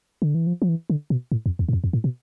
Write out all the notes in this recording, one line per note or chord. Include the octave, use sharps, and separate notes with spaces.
D3
E3
F3
F3
E3
D3
B2
A2
F2
E2
G#2
F2
F2
A2
B2